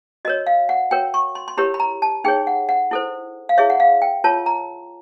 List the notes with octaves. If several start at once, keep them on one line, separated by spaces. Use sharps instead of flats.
F#4 A#4 C#5 D#5
F5
F#5
F#4 A#4 C#5 G5
C#6
C6
C6
E4 G4 A#4 C#5 B5
B5
A#5
A5
D#4 G#4 C#5 G5
F#5
F#5
E4 A4 C5
F5
E4 G#4 C#5 E5
F#5
F5
G5
F4 A#4 C#5 A5
A#5